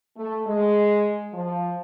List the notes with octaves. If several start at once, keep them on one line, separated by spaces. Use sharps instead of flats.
A3
G#3
F3